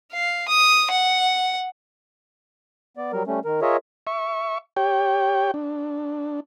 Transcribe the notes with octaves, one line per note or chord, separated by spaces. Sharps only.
F5
D#6
F#5
B3 D5
F#3 G3 A#4
G3 A3 C#4
D#3 A#4
F4 G#4 A#4 C#5 D#5 E5
E5 C#6
G4 C#5 G5
D4